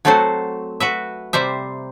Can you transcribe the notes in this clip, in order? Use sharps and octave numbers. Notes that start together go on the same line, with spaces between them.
F#3 A3 C4 F#4 A4 C5
F#4 B4 E5
C3 G3 C5 E5